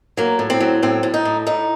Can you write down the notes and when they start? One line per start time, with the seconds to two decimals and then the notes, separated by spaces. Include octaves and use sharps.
0.17 F#3 A#3
0.39 A2
0.50 C4
0.60 F#3
0.83 A2 C4
1.03 A2
1.14 D#4
1.25 A2
1.46 A2 D#4